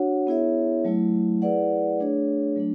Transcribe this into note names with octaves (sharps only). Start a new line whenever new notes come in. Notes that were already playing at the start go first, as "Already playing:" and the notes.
Already playing: D4 F#4 C#5 F#5
B3 E4 G#4 C#5 E5
F#3 A3 E4
E4 G#4 B4 D5 F#5
A3 D4 G#4 C#5
F#3 A3 D4